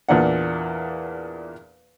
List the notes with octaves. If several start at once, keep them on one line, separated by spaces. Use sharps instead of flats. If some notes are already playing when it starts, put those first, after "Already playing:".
E2 A#2 D4 F#5